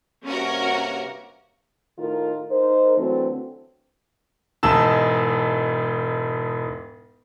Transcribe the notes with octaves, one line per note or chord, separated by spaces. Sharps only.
G2 C3 A#3 C#4 F#4 A#4
A2 D#3 D#4 F4 A#4
D#4 A#4 C5
D3 E3 F#3 A3 C4
E1 G#2 D#4 A5 E6 E7